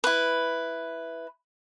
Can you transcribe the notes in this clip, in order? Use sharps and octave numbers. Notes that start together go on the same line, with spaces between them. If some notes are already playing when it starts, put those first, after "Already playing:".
E4 B4